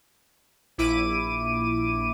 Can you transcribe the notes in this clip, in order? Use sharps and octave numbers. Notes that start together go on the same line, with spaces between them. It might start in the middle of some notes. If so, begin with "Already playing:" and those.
A#1 E4 D6 D#7